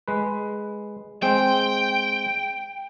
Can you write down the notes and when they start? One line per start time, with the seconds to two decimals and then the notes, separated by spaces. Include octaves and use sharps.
0.08 G#3 B4
1.22 G#3 C4 G5